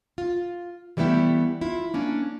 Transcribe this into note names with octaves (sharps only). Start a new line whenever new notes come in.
F4
E3 G3 A3 B3 E4 G4
E4 F4
A#3 C#4 D4